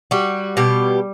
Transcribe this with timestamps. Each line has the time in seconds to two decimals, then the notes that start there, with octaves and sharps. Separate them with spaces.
0.11 G3 F#4
0.57 B2 G4